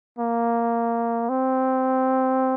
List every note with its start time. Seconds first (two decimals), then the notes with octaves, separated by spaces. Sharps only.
0.19 A#3
1.29 C4